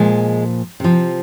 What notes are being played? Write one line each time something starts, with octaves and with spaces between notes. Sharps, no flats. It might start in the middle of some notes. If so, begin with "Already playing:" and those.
Already playing: A#2 F3 G#3
C3 F3